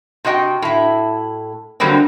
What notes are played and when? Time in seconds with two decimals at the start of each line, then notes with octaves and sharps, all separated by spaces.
0.25 C3 F#4 D#5 G5
0.62 A2 E4
1.80 D3 E3 F#3 G3 A#3 C4